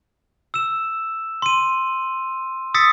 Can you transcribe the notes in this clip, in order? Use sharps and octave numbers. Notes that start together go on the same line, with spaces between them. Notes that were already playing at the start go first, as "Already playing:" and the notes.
E6 E7
C6 D#7
D#6 E6 A6 B6 C#7